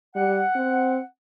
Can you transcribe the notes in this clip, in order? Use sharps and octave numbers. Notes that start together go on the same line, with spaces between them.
G3 F#5
C4